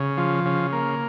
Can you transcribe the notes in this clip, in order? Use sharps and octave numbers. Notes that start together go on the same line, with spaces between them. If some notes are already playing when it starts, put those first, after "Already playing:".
Already playing: C#3
F3
C#3
A#3